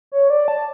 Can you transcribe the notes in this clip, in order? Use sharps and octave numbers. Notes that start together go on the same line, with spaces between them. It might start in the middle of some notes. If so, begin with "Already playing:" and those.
C#5
D5
A5